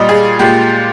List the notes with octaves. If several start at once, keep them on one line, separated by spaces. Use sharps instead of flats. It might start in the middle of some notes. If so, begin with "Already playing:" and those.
Already playing: A#2 G3 D#5
G#4
A#2 G#3 G4